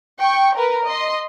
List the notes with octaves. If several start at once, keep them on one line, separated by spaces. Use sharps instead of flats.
G5 C#6
A#4 B4
D#5 C6